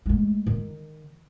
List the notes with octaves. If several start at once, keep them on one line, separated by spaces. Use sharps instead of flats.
G#3 A3
D#3